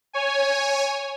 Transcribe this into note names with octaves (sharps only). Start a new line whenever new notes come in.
C#5 G#5